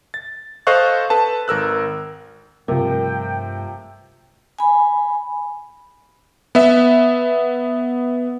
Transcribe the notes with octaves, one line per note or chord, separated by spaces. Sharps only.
A6
A4 C5 D#5 F5 C#6 F#6
A4 B4 A5
G#1 A#4 E6 F#6
G2 C3 F3 G3 A3 A#4 G5
G#5 B5
B3 E5